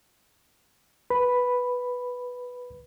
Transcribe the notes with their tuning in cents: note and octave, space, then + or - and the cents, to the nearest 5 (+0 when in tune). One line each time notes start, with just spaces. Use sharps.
B4 +0 B5 +0